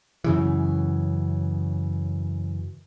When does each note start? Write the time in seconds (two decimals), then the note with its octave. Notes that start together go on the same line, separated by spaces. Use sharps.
0.24 F#2 C#3 E3